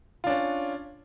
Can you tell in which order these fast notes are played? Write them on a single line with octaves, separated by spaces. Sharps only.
F4 D4 C#4